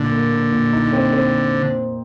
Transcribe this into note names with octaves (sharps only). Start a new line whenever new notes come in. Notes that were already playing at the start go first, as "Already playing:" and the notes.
Already playing: A#2 D3
A#3
A#2
A#2
D#4
C4
C4